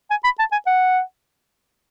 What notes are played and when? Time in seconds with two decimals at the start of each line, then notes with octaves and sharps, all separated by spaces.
0.11 G#5
0.24 B5
0.39 A5
0.52 G#5
0.67 F#5